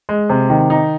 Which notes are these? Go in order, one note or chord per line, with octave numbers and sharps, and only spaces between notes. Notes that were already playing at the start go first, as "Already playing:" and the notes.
G#3
C3
D#3
D#4